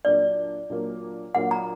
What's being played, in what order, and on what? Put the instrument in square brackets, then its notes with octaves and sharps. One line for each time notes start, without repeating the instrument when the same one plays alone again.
[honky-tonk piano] A#2 F#3 A#3 D4 [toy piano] D5
[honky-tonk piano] A#2 F#3 A#3 D4
[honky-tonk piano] A#2 F#3 A#3 D4 [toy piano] F#5
[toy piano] A#5